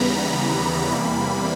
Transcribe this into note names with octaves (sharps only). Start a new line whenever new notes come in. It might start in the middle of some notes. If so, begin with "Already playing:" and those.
Already playing: D#2 C#3 E3 G3 B3 A#5 B5
B5
E2 C3 E3 G3 A#3 B5